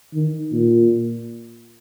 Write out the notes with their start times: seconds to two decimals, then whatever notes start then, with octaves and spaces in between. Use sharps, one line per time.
0.14 D#3
0.52 A#2